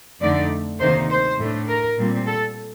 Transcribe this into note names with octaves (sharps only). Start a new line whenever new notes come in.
F2 D3 A3 D#4 D5
D2 C3 D#3 A#3 D#4 C5
C5
A2 A3 D4
A#4
A#2 G3 C4
A4